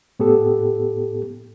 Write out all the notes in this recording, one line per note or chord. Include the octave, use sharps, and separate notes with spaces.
A2 B3 G4 A4